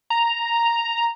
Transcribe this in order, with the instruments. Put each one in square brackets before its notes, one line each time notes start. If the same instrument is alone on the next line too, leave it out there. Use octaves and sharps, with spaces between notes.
[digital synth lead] A#5